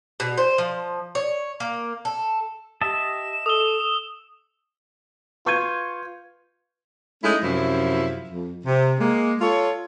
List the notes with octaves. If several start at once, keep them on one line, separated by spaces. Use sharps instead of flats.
B2
C5
F3
C#5
A#3
A4
G4 D#5 E5 A5 E7
A4 D#6 E6 G7
F4 B4 C#6 G6 G#6 D#7
G#3 A3 C#4 D#4 E4
F#2 C3 F3 E4
F2
C3
G#3 A#3
F4 A4 C#5